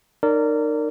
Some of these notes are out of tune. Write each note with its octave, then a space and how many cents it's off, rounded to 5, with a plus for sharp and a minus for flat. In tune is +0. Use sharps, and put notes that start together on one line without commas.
D#4 -35 A#4 -20 D5 -25